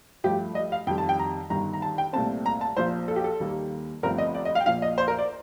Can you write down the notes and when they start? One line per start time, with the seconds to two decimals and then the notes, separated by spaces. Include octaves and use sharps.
0.24 G2 F3 A3 G4
0.55 D#5
0.72 F5
0.87 F2 D#3 G3 G5
0.98 A5
1.09 G5
1.19 A#5
1.50 G1 G2 D#3 A#5
1.73 A#5
1.82 A5
1.98 G5
2.13 C2 A#2 A3 C4 A5
2.46 A#5
2.61 A5
2.77 A#1 A#2 F3 C5
3.08 A4
3.16 G4
3.24 A4
3.40 D#2 D#3 G3 A#3
4.03 G1 G2 F3 A3 C4 A#4
4.18 D#5
4.35 D5
4.45 D#5
4.55 F5
4.60 G5
4.66 A#1 A#2 F3 F5
4.82 D#5
4.98 C5
5.08 A#4
5.18 D5